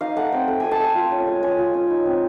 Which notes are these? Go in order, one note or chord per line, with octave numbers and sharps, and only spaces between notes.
D#4 F5
A3 F#5
C4 G5
A3
A3 G#5
A5
A3 G#5
F4
C#4
G#3
C#4 G#5
F4
C#4
D#4
C4